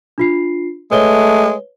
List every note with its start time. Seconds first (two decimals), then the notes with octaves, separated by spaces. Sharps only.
0.18 D4 F4 C7
0.91 G#3 A3 B4 C#5 G7